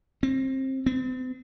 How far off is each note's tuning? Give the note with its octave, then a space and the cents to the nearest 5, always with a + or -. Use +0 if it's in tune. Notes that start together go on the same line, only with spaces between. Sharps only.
C4 +25
C4 -40